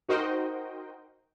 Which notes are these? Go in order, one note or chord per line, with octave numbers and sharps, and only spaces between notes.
D#4 F#4 A#4 C5 D#5 G5